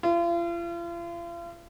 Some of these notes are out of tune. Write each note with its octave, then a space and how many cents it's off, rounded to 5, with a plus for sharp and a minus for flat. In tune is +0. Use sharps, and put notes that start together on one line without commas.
F4 -40